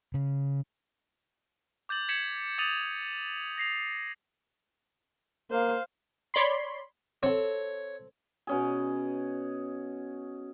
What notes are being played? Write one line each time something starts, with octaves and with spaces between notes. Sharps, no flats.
C#3
D6 G6 A6 F#7
G#6 B6 C#7 E7 F#7
D6 D#6 A6 D#7 F7 F#7
A#6 C7 F7
A#3 C5 F5
C#5 D5 B5 C6
C4 A4 C#5
B2 C#4 G#4